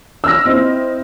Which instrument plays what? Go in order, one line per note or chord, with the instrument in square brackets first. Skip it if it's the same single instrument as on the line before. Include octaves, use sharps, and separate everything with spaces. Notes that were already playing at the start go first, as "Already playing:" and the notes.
[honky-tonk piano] E6 F6 A#6
C4 E4 D#5